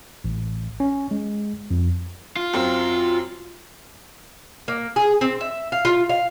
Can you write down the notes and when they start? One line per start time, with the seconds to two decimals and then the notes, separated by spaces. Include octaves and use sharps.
0.24 A1
0.80 C#4
1.11 G#3
1.71 F2
2.36 F4
2.53 F#2 C4
4.68 A#3
4.96 G#4
5.21 C4
5.41 E5
5.72 F5
5.85 F4
6.09 F5